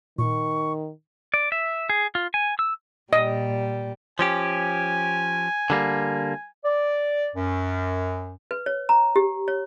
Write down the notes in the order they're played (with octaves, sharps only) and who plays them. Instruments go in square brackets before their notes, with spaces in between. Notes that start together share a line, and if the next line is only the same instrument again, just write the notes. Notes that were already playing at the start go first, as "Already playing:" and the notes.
[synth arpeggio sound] A#2 [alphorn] D#3 [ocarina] C#6
[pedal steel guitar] D5
E5
G#4
F4
G#5
E6
[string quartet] A#2 G3 [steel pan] D#5
[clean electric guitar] F3 C#4 G4 [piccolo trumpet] G#5
[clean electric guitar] D3 G3 A#3
[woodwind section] D5
F#2
[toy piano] B4
C#5
A#5
G4
C#5